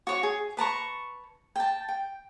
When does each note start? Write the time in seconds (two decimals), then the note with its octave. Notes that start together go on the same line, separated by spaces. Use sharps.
0.07 F#4 C#5 C#6
0.23 G#4
0.57 B4 A5 A#5 C#6
1.56 G5 A5
1.89 G5